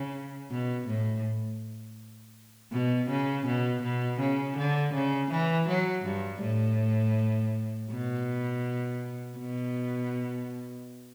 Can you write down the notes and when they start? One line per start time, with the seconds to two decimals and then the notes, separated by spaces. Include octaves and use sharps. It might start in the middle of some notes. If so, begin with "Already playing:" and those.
Already playing: C#3
0.50 B2
0.87 A2
2.72 B2
3.09 C#3
3.46 B2
3.83 B2
4.20 C#3
4.57 D3
4.94 C#3
5.31 E3
5.68 F#3
6.05 G2
6.42 A2
7.90 B2
9.38 B2